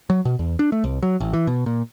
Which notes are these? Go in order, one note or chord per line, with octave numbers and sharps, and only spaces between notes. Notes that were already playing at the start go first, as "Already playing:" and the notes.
F#3
B2
E2
D4
A3
C2
F#3
A1
E3
B2
A#2